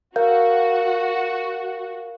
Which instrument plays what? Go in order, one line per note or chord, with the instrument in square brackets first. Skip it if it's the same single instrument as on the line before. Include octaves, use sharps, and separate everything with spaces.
[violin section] F#4 [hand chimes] A#4 F5 G6